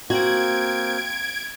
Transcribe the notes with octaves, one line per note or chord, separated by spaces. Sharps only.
A#3 C4 F#4 G#6 D7